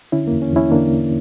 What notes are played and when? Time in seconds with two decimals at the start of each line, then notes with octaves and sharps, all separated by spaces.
0.12 D3 C#4 E4
0.27 E2 A#3
0.42 C#4
0.52 E2 C#4 E4
0.71 D3 A#3 D4